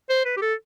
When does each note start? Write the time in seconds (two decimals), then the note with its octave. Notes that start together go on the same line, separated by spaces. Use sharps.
0.09 C5
0.25 B4
0.37 G4
0.42 A4